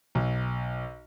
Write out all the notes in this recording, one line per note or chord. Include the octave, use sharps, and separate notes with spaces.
B1